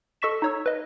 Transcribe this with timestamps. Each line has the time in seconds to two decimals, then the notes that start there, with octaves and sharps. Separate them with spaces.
0.22 A4 D#5 C#6 B6 E7
0.42 D#4 C#5 E6
0.66 B4 D#5